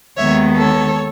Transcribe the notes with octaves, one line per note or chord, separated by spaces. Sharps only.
D#2 D#3 G#3 B3 C#5 E5
A4 C#5